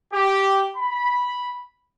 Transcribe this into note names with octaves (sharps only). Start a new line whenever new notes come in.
G4
B5